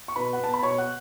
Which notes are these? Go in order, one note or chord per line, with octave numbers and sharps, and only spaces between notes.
C#6
B2 B4 B5
F#5
B3 A5
B5
B2 C#5 C#6
F#5 F#6